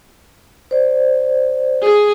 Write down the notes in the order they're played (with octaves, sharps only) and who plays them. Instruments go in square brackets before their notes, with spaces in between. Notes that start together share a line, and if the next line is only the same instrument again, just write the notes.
[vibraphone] C5 D5
[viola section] G#4